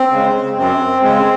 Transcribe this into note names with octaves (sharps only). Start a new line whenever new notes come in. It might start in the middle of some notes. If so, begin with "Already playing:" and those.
Already playing: C4
C#3 G#3
F#2 C4
C#3 G#3 C4